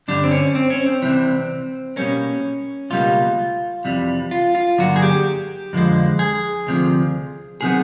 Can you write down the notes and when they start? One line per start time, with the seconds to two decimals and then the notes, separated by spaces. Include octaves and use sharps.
0.08 G2 D3 G3 D4
0.24 C4
0.31 C#4
0.55 C4
0.70 C#4
0.86 C4
1.02 C2 C3 E3
1.96 B2 G3 A#3 C#4
2.90 C#2 B2 G3 A#3 F4
3.84 F2 C3 E3 G3
4.31 F4
4.55 F4
4.78 G2 D3 F#3 A#3 F#4
4.96 G#4
5.02 G4
5.73 F2 D3 F3 G#3
6.19 G#4
6.67 D2 C3 F3
7.61 C3 D#3 F#3 B3 G#4